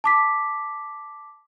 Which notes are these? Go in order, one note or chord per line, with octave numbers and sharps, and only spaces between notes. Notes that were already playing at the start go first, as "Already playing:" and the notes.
A5 D6 B6